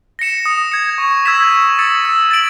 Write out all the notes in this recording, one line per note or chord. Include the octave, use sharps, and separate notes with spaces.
A#6 C#7 E7
D#6
G#6 C#7
C#6
E6 G#6 B6 E7
C#6
E6 A6 C#7
E6
A6 D7 F#7